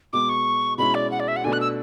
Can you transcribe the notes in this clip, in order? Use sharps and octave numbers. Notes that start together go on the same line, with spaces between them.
B2 G#3 B3 D6
C#6
B2 G#3 C#4 E4 B5
D5
F#5
D5
E5
F#5
B2 A3 D4 G#5
F#6
E6